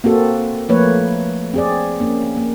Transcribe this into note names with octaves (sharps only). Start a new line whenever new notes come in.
A#3 C4 F#4 A4
F3 A3 A#3 B4 C#5
C4 G#4 D5
A#3 C#4
A#3